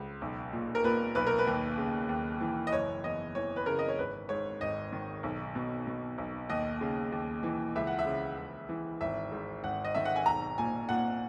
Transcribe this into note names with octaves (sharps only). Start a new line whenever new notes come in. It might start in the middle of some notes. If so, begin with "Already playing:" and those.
Already playing: C#2
B1
A#2
A#4
A#2 B4
B1 B4
A#4
B4
D#2
C#3
D#2
E3
D#5
F#1 C#5
E2 D#5
E3 C#5
B4
C#3 A#4
D#5
C#5
G#1 B4
G#2 C#5
G#1 D#5
D#3
B1
B2
B2
B1
D#2 D#5
C#3
D#2
E3
C#2 E5
F#5
E5
C#3
C#2
E3
G#1 E5
G#2
G#1 F#5
D#5
D#3 E5
F#5
G#5
B1 A#5
A#2 G#5
A#2 F#5